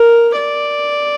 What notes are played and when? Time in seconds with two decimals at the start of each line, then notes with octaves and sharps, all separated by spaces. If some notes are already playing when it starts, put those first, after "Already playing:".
Already playing: A#4
0.37 D5